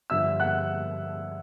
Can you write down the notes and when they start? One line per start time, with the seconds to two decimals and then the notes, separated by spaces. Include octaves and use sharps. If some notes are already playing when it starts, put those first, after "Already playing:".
0.10 G2 D3 F3 E5 E6
0.40 F#5 F#6